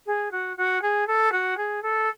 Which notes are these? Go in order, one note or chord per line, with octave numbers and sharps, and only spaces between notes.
G#4
F#4
F#4
G#4
A4
F#4
G#4
A4